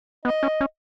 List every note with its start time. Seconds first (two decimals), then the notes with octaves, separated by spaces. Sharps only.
0.25 B3 D#5
0.43 C#4
0.61 C#4